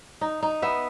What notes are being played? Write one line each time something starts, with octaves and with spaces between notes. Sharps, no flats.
D#4
D#4
B3 E5